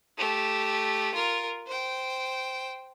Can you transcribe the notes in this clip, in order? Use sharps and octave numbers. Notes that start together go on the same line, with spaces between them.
A3 G4
F4 A#4
C5 G5